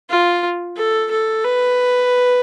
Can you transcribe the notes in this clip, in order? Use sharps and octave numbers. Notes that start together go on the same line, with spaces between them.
F4
A4
A4
B4